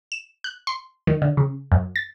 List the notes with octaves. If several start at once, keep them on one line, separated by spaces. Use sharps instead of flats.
E7
F#6
C6
D#3
D3
C#3
F#2
A6